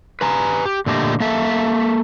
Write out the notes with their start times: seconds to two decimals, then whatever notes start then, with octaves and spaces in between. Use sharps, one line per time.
0.21 B4 G#5 A#5
0.65 G4
0.86 A#2 D3 A3 G4 D#5
1.20 A#3 A4 E5